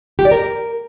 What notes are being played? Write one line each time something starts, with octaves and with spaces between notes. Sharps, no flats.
G4
D5
A#4